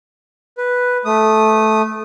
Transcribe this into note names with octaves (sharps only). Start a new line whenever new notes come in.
B4
A3 D#6